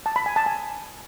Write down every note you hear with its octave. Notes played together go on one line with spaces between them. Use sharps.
A5
B5
G#5
A5
G#5